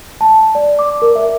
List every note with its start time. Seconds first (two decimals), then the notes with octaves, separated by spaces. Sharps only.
0.21 A5
0.55 D5
0.79 D6
1.02 A#4
1.16 E5